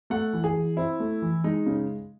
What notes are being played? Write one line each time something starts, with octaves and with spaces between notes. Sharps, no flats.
A3 F#5
E3
G#4
E3
C4 E4
A3
E3
G#3 D#4
C#3